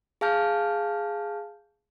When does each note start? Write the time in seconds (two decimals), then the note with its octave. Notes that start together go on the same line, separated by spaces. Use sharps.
0.21 G#4 F5 A5 F6 G6